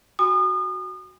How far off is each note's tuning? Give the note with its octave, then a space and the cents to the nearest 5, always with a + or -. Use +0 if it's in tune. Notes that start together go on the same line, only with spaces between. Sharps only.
F#4 +0 G#5 -40 D#6 -35